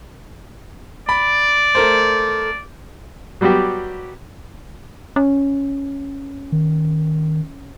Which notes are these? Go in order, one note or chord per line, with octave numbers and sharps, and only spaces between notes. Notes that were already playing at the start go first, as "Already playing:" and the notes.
D5 B5
A3 A#4 C5
F#3 G3 B3 F#4 G4
C#4
D#3